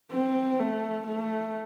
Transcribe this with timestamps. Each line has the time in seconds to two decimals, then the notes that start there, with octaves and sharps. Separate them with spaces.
0.12 C4
0.60 A3
1.07 A3